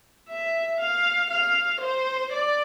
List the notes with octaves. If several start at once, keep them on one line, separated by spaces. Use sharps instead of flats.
E5
F5
F5
C5
D5